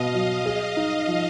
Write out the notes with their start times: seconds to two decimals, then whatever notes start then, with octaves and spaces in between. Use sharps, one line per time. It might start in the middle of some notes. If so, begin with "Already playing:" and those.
Already playing: B2 B3 D#5 F5
0.14 F#3
0.46 G#4
0.77 D#4
1.07 F3